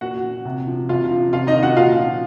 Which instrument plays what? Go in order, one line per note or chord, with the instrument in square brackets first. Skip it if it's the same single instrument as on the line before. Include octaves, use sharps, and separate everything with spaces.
[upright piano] A#2 F#4 F#5
F3
C3
F3
C3 F4 F5
F3
C3 F4 F5
D#4 D#5
D#3
F#4 F#5
A#2 F4 F5
F3